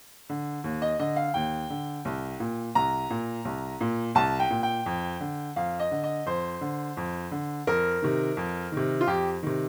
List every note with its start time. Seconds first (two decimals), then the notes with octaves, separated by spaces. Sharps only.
0.29 D3
0.64 D#2
0.82 D#5
0.99 D3 D#5
1.16 F5
1.34 D#2 G5
1.70 D3
2.05 C2
2.40 A#2
2.75 C2 A#5
3.10 A#2
3.45 C2
3.81 A#2
4.15 C2 A5
4.39 G5
4.50 A#2
4.63 G5
4.86 F2
5.20 D3
5.56 F2 F5
5.80 D#5
5.91 D3
6.04 D#5
6.26 F2 C5
6.61 D3
6.97 F2
7.31 D3
7.67 F2 A#4
8.02 C3 D#3
8.37 F2
8.72 C3 D#3
9.01 F4
9.07 F2 G4
9.43 C3 D#3